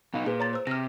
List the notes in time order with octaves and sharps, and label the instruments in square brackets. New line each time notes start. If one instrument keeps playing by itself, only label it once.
[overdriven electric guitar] B2 D#4 [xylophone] F5
[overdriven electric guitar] A#2 [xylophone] G#4 B4
[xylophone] C#5 A#5 A6
C5 E6
[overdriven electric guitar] C3 [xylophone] F6 A#6